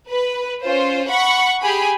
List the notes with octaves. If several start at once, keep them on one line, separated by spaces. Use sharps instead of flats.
B4
C#4 F4 C5
F#5 B5 C#6
G4 G#4 G#5 B5